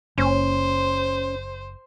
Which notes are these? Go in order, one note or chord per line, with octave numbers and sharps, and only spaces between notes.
F#1 C#4 C5